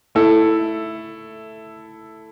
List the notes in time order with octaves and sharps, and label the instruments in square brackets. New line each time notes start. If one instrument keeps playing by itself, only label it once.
[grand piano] A3 E4 A4